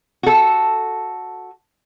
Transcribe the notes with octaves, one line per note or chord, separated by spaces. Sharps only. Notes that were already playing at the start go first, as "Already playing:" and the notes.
F#4 A4